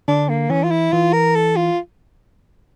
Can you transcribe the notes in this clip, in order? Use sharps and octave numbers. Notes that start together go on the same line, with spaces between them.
D3 D4
A#3
E3 C#4
F4
E4
E3 F4
A#4
A4
F4